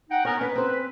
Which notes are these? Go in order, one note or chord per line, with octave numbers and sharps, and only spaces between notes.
D#4 F#5 G5
B3 C#4 A#4 C#5
C#4 B4
C4 C5